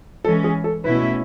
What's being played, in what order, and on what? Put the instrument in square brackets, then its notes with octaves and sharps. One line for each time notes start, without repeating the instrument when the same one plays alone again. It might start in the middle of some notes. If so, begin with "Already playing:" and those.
[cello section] E3 G#3 C#4 [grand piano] A4
[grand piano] G#4
A4
[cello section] B2 A3 C#4 E4 [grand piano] B4